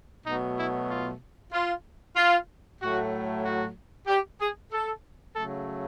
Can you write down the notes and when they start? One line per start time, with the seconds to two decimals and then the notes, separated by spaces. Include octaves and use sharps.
0.24 B2 F#3 A3 D#4
0.56 E4
0.88 F4
1.52 F4
2.16 F4
2.79 A2 F#3 A3 F#4
3.44 F#4
4.07 G4
4.40 G#4
4.71 A4
5.35 C#3 F#3 A3 A4